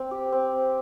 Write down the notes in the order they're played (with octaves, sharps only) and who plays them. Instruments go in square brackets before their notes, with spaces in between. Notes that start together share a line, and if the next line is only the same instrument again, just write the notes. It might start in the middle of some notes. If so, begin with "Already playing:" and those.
Already playing: [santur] C4
G4
C4